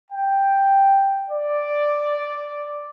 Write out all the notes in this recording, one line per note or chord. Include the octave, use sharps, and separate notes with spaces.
G5
D5